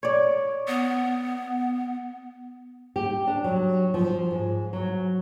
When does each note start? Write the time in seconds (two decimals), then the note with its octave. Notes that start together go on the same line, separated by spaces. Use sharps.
0.03 C#5 D5
0.68 B3
2.96 G4
3.27 D4
3.44 F#3
3.94 F3
4.31 G#2
4.73 F#3